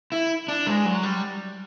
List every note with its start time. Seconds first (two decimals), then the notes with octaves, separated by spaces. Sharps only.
0.12 E4
0.48 D4
0.67 G#3
0.85 F#3
1.03 G3